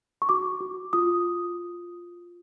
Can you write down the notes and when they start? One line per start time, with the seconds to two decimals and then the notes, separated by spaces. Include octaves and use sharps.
0.22 C#6
0.29 F#4 D6
0.61 F#4
0.93 F4 D#6